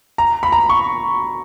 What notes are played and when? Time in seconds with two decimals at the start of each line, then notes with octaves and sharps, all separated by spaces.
0.18 A#5
0.43 B5
0.52 A#5
0.69 C#6